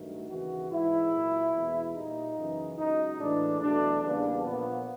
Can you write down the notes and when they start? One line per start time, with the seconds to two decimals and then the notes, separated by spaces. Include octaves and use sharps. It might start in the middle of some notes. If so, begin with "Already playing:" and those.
Already playing: G2 D#3 F#3 A3
0.29 D#2 C#3 E3 F#4
0.71 G#2 E3 G#3 E4
1.12 A#2 F#3 A#3
1.54 E2 B2 G#3
1.95 A#2 G3 A#3 D#4
2.37 F#2 C#3 E3
2.78 C#2 C#3 F#3 D#4
3.19 A2 E3 G#3 D4
3.61 E2 B2 F#3 A3 D4
4.03 E2 C#3 E3 G3 A#3 D4
4.44 A#2 F3 A#3 B3